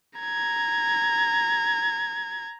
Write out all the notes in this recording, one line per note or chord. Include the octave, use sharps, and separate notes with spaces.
A#5 G#6